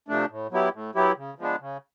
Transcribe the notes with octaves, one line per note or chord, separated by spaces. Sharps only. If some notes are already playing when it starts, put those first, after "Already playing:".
C3 F3 A3 D4
A2
F#3 B3 E4 G4
A2
F#3 B3 E4 G4
C#3
F3 G#3 B3 D4
C#3